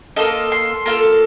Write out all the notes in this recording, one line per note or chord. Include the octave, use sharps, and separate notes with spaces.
A#3 F4 A4 D#5
C6
A#3 F4 A4